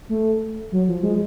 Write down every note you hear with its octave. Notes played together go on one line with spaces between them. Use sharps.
A3
F#3
F3
G#3